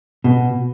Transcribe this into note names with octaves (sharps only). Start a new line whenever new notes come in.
B2